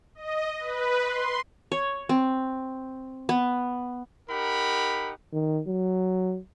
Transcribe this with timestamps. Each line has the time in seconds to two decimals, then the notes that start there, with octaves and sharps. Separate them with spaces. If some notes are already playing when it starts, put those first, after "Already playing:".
0.15 D#5
0.59 B4
1.03 C6
1.72 C#5
2.09 C4
3.29 B3
4.30 D#4 G4 A#4 F#5 B5
5.33 D#3
5.67 F#3